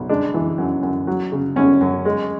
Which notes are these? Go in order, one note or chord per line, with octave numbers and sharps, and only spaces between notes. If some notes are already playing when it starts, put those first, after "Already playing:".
Already playing: B1
G#3 D4
E3
F#2
F#2
F#3
C#3
F#2 C#4
F#2
G#3